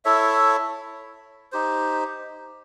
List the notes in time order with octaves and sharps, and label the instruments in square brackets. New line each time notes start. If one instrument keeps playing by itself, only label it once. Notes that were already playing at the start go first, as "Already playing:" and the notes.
[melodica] E4 A4 C#5 E5
D#4 G4 C5